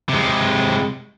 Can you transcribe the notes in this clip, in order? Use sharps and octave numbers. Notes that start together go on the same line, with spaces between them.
C3 G#3